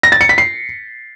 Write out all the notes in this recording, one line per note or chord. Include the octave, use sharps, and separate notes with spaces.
A#6
A6
C#7
B6
C7